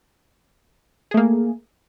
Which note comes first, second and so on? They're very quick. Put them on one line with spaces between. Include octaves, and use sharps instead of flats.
G#4 A3 A#3